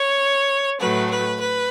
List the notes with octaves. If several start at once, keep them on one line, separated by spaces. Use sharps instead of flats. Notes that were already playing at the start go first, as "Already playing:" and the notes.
Already playing: C#5
A2 F#3 A3 B4
B4
B4